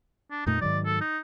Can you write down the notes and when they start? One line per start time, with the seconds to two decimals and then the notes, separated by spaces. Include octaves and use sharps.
0.31 D4
0.46 F2 A#2 A3 D#4
0.61 G#2 D#3 F#3 D5
0.86 A4
1.01 D#4